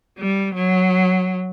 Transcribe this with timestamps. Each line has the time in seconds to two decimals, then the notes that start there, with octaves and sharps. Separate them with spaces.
0.16 G3
0.54 F#3